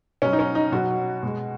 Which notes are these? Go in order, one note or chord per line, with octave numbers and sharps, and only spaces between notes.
B2 F#3 C#4
D#4
C#4
D#4
B2 F#3 F#4
B2 G#3